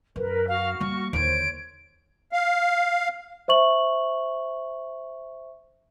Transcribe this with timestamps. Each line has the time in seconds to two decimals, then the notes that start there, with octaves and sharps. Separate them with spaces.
0.16 F#2 A#4 B4
0.48 F#4 F5 F6
0.81 G3 A#3 C#6
1.13 D#2 D3 C5 C#5 D7
2.32 F5
3.48 C5 E5 C#6 F#7